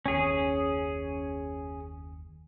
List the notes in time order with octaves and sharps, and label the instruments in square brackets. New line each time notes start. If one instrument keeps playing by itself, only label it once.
[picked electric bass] F#1 D#2 [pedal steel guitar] C#4 G#4